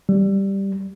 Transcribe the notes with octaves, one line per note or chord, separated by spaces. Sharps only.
G3